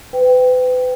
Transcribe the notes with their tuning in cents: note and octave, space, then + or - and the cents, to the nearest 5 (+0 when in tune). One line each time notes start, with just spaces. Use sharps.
B4 +35 G5 +0